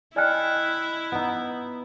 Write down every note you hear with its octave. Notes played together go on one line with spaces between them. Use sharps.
E4 D5 D#5 G5 G#5 F6 F#6
B3 D#4